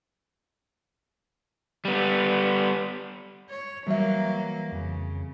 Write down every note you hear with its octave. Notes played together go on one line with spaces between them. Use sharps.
G3 B3
C#5
E3 F#3 G3 A#3 E5
F2 C#3